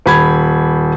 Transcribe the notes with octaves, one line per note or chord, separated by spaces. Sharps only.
D#1 B5 G#6